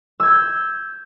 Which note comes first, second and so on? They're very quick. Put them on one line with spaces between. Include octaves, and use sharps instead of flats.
E6 G#6 G6